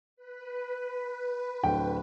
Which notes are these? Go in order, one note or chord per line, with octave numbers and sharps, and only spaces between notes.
B4
D1 D3 G5